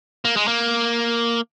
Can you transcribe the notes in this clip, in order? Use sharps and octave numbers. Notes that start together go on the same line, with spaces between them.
A#3
G#3
A#3